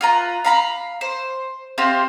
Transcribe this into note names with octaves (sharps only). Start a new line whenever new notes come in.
F4 B4 A#5
F5 A#5 B5
C5
C4 F4 G4 C5